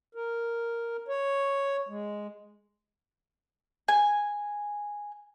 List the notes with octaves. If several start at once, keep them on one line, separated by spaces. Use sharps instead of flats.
A#4
C#5
G#3
G#5